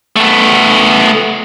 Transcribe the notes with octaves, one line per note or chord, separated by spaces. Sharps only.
A3 B3